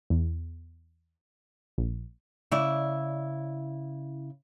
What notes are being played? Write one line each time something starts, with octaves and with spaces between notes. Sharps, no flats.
E2
A#1
C#3 E4 D5